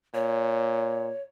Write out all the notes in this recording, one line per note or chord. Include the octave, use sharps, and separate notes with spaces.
A#2 C#5